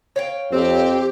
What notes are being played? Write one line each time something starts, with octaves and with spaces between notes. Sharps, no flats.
C#5 F5 G5
F2 C4 G4